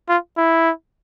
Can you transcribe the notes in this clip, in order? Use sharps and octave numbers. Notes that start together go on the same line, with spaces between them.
F4
E4